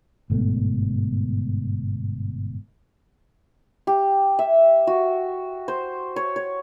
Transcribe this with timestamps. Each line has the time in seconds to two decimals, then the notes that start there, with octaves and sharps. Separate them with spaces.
0.30 G1 G#2 B2 A3
3.87 G4
4.39 E5
4.87 F#4
5.68 C5
6.16 C#5
6.36 C#5